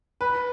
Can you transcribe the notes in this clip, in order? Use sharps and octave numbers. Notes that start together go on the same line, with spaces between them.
B4